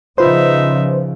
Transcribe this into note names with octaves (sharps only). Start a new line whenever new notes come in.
C#3 F3 D#4 F4 B4 C5 E5